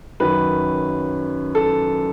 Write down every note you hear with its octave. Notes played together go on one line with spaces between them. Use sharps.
F#2 D#3 F#3 B4
A4